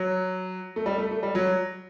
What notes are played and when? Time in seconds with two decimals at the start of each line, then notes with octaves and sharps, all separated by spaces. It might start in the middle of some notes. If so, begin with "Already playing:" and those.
Already playing: F#3
0.76 A3
0.86 G3
0.98 A3
1.11 A3
1.23 G3
1.35 F#3